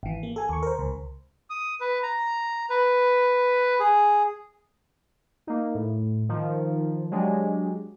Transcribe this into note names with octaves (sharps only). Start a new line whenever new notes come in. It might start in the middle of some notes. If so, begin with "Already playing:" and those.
G#1 E3
A#3
A4 G#5
D#2 C#6
A#4 C5
C#2
D#6
B4
A#5
B4
G#4
A#3 D#4
A2
D#3 F3
F#3 G#3 D4 G4